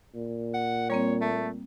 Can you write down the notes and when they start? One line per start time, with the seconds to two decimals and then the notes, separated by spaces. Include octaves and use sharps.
0.15 A#2
0.54 F#5
0.90 G3 A#3 C4 C#5
1.21 A3